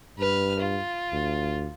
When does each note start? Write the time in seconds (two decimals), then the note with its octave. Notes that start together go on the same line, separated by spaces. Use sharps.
0.18 G2 B4 F6
0.60 F4
1.12 D2